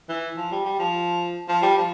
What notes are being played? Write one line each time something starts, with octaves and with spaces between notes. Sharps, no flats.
E3
F3
G3
G3
F3
F3
G3
F3